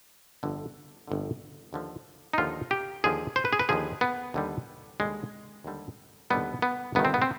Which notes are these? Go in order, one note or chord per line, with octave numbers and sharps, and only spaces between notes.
G1 F2 D3
G1 F2 D3
D#2 D3 F3
D#4
D#2 D3 F3 F4
G4
D#2 D3 F3 G#4
C5
B4
G#4
B4
D#2 D3 F3 G#4
B3
D#2 D3 G3
D#2 D3 G3 G#3
D#2 D3 G3
D#2 D3 G3 B3
B3
G1 G2 D#3 B3
C4
B3
C4